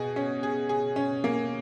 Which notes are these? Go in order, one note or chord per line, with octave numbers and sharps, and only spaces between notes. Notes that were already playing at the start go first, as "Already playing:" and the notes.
Already playing: B2 G#4
C#4
G#4
G#4
C#4
A#3